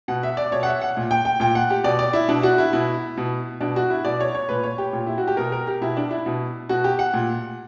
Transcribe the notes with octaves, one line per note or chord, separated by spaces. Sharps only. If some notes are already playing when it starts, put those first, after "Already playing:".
B2 F#5
E5
D5
B2 C#5
F#5
E5
F#5
A#2
G5
G5
A#2 G5
F#5
G4
B2 D5
D5
E4
B2 D4
F#4
E4
B2 E4
B2
B2 D4
F#4
E4
B2 D5
C#5
C#5
A#2 B4
C#5
G4
A#2
E4
F#4
G4
B2 A#4
A#4
G4
B2 E4
D4
E4
B2
B2 F#4
G4
F#5
A#2